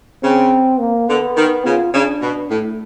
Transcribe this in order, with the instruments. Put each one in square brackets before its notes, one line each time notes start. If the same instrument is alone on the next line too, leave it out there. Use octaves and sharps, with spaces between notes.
[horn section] C#3 [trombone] C4
[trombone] A#3
[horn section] D3 [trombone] B3
[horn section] D#3
[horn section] C#3 [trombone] F4
[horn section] C#3 [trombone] D4
[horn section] B2
[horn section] A2 [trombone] A3